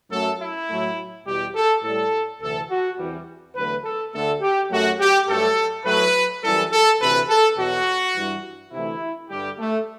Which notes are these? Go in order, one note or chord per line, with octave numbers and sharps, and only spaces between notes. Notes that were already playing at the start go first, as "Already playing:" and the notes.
F#2 F#3 A3 A4
E4
A2 F#3 A3
E2 B2 G3 G4
A4
A2 G3 A4
D2 C3 E3 A4
F#4
E2 C3 E3 G3
E2 D3 F#3 A3 B4
A4
D2 D3 A3 A4
G4
F#2 F#3 A3 F#4
G4
G2 F#3 A3 A4
A2 F#3 A3 B4
F#2 E3 G3 A4
A4
D2 C3 E3 B4
A4
E2 B2 F#3 F#4
G2 E3 G3
D2 C3 E3 A3 E4
G2 D3 G3 G4
A3